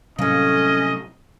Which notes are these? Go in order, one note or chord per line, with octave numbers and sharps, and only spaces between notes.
A2 C3 F#3 G3 A#3 C#4 D#5